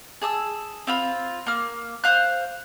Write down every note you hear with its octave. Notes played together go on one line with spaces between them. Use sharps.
G#4 A5 D#6 E6
C4 F4 B5
A#3 F6
C5 F5 F#6